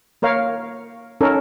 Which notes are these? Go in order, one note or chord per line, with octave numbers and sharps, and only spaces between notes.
A#3 A#4 C#5 F5
C#4 D#4 A4 A#4